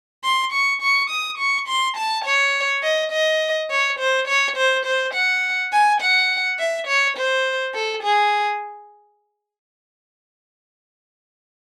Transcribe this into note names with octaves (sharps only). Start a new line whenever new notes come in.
C6
C#6
C#6
D#6
C#6
C6
A5
C#5
D#5
D#5
C#5
C5
C#5
C5
C5
F#5
G#5
F#5
E5
C#5
C5
A4
G#4